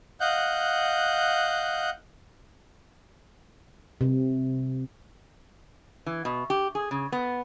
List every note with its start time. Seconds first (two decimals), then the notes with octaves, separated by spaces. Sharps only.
0.21 D#5 F5 F#5 F#6 G6
4.01 C3
6.06 E3
6.25 B2
6.50 G4
6.75 G#4
6.91 C#3
7.12 B3